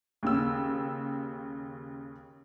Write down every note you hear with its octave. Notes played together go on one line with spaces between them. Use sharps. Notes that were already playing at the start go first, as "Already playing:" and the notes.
D#2 C#3 E6